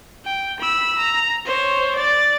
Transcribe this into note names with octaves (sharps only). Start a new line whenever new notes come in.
G5
B5 E6
A#5
C5 C#5
D5 A6